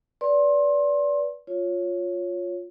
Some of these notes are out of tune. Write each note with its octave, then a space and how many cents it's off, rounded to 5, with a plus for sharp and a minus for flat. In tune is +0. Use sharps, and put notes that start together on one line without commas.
B4 -15 D5 -25 C6 +25
F4 +10 C#5 +0